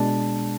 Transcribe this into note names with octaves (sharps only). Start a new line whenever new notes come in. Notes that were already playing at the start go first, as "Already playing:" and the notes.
Already playing: B2 G#3 D4 A5